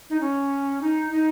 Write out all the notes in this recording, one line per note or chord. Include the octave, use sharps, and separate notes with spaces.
D#4
C#4
D#4
D#4